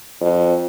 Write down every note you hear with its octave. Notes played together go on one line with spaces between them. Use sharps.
F2